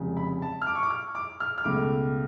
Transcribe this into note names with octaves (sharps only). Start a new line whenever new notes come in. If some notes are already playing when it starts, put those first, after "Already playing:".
Already playing: F1 F2 C#3 G#3
B5
A5
F6
D6
C#6
D6
F6
D6
F6
F6
C#2 B2 A3 D6